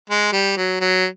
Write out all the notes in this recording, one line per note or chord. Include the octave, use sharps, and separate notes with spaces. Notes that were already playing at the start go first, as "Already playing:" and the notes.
G#3
G3
F#3
F#3